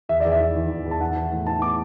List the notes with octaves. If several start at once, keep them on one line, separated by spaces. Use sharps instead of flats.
E2 E5
E2 D5
E5
E3
E3
E2
E2
A5
E3 F#5
E3
A2
E3 A5
B3 D6